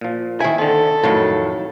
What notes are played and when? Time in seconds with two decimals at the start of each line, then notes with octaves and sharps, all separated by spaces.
0.01 A#2 F3
0.40 D#3 E4 G#5
0.58 D3 C4 A4
1.03 F2 A2 D#3 F#3 A5